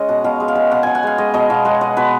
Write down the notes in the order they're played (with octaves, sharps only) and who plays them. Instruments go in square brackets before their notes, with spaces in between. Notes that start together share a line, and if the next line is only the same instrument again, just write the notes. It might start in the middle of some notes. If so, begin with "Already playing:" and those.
Already playing: [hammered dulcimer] G#3 C#4 D#5
B2 F#5
B2 F5
G#3
F5
G#3
B2 F#5
B2 G#5
F#5
G#3 F5
G#3 D#5
B2 D#5
B2 F5
G#3 F#5
G#3 D#5
B2 B4